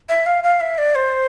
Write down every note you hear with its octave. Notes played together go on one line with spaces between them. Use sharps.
E5
F5
F5
E5
D5
C5